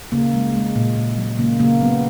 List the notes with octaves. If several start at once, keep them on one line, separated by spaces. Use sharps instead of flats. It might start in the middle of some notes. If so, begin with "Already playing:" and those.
C#3 A#3
G#3
G#3
A#2
A#2
F#3
C#3 A#3
C#3 A#3
F#3 B3